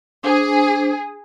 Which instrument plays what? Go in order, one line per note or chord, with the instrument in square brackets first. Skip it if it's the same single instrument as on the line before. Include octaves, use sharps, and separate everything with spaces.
[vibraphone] D4 C5 [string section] G#4